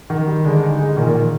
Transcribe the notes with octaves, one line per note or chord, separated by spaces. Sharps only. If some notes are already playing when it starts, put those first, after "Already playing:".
D#3
G3
D3 G#3
D#4
G#3
A#2 D#3
D#3